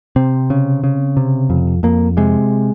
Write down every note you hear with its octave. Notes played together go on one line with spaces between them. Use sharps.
C3 C4
C#3
C#3
C3
F2
F2 A#3
C3 G#3